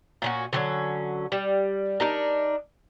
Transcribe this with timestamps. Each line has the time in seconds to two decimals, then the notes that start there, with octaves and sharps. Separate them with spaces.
0.22 A#2 C#4 F#4
0.53 D3 F#3 C#4
1.32 G3
2.00 D4 D#4 A#4